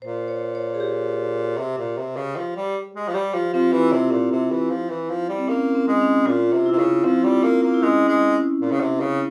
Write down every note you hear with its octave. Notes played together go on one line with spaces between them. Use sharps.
A#2 C5
C#5
C#5
G#4
G4
C3
A#2
C3
C#3
F3
G3
G#3
F3
G3 G4
F3 F4
F3 C4
E3 E4
C3
A#2
C3
E3
F3
E3
F3
G3
C4
A#3 C#4
C4
G#3
C#4
A#2 F4
C3
E4
C3
C#3
F3 C4
G3
A#3
A#3
E4
G#3 C#4
G#3
A#2
C#3
C3
C#3